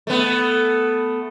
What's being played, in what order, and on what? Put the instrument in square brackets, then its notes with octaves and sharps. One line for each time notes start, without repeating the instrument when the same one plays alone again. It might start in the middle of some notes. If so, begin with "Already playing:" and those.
[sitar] A3 B3